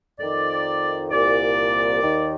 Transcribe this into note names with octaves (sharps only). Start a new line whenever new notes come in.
F2 D#3 D5
C2 A#2 D5
D#2 D#3